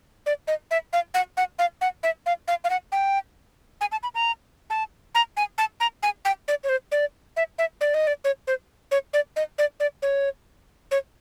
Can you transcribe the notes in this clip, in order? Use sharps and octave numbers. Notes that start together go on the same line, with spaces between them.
D5
D#5
E5
F5
F#5
F#5
F5
F#5
E5
F5
F5
F5
F#5
G5
G#5
A5
B5
A#5
A5
A#5
G#5
A5
A#5
G#5
G5
D5
C#5
C5
D5
E5
E5
D5
D#5
D5
C#5
C5
C#5
D5
D#5
D5
D5
C#5
C#5